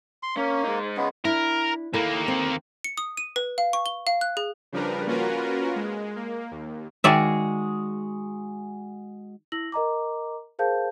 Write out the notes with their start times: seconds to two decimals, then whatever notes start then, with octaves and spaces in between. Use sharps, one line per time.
0.23 C6
0.37 A#3 C#4
0.64 G#3 D#4
0.97 C#2 C#3 G#3 B3
1.25 D4 E4 A#4
1.94 D#2 A#3 E4 A4 A#4
2.27 C4 A4
2.84 C#7
2.97 D#6
3.17 D#7
3.36 B4
3.58 F5
3.73 C#6
3.86 G7
4.07 F5
4.21 F#6
4.37 G#4
4.72 C#3 F3 G3 D4 A#4 B4
5.07 A#3 C#4 F4 F#4 A#4 B4
5.76 G#3
6.16 A#3
6.51 D#2
7.04 D#3 G#3 F#4 G#4 D5 E5
9.52 E4 E6 A#6 F#7
9.72 A#4 D#5 A#5 D6
10.59 G#4 A#4 C5 F5 A5 G6